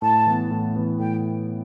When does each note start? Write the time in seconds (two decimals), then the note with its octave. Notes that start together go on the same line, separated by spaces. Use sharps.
0.02 A2 A5
0.27 E3 B3
0.51 A2
0.76 E3 B3
0.99 A2 G5